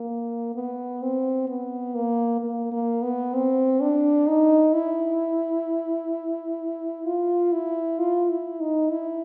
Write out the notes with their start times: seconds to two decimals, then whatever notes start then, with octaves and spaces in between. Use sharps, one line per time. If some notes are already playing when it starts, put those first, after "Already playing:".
Already playing: A#3
0.55 B3
1.02 C4
1.48 B3
1.95 A#3
2.41 A#3
2.72 A#3
3.02 B3
3.34 C4
3.81 D4
4.27 D#4
4.73 E4
7.05 F4
7.52 E4
7.99 F4
8.30 E4
8.60 D#4
8.91 E4